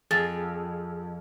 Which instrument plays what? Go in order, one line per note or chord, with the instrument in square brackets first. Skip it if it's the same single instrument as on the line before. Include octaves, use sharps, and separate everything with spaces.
[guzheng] F2 [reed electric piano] G#4 [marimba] A6